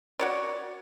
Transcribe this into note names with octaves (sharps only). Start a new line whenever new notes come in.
F#4 C#5 D5